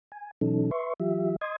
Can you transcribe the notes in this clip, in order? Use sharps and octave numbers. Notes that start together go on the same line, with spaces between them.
G#5
B2 E3 F#3 C#4 D#4 A4
B4 E5 C6 C#6
E3 F#3 F4 G4 E5
D#5 C6 D#6 G#6